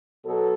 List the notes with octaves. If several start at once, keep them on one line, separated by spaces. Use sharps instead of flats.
B2 F#3 A4